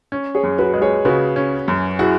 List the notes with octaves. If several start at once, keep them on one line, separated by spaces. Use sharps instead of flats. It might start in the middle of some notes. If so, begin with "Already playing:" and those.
C#4
G#4 C#5
F#2
F#4 B4
G#3
G#4 C#5
C#3 F#4 B4
C#4
F#2
E4 F#4 G#4